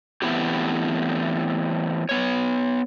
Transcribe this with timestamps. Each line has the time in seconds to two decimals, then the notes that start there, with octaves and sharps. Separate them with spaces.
0.22 E3 A3 B3 C4 E4 G4
2.09 B3 C#5